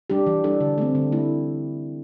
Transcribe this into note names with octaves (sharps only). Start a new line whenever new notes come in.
G3 D4 G4
E3
G3 D4 A4
D3
A3 C4
D3
A3 E4